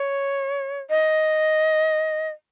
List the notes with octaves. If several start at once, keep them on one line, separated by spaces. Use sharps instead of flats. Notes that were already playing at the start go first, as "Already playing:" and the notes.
Already playing: C#5
D#5